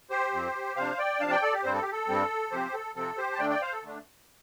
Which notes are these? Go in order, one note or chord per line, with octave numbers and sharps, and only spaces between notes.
G4 C5
F2 F3 C4
C3 F3 D4 C5 F5
D5 G5
C3 F3 D4 F5 A5
D5 G5
A4 D5
G4
G2 G3 C4 C5
A4
G4
A4
G2 G3 C4
C3 F3 C4 G4 C5
A4
C3 F3 C4 A4
G4 C5
A5
D3 A3 D4 D5 G5
D5 G5
C5 F5
A4
D3 A3 D4